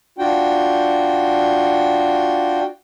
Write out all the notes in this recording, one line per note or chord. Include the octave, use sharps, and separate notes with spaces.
D4 F4 F#4 G5